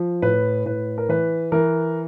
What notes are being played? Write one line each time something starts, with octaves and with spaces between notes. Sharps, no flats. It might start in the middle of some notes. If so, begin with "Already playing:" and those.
Already playing: F3
A2 B4
A2 B4
A#4
E3 B4
E3 A#4